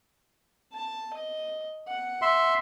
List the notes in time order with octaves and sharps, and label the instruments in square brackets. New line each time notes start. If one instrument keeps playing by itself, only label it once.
[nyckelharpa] A5
D#5
F#5
[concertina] E5 C6